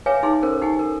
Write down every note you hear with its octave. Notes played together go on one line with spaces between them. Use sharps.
G#4 B4 C#5 E5 F5 G#5
D#4 G#4 C6
C#4 A4 A#4 C5
D#4 G4 F#5 G#5
A4 A#4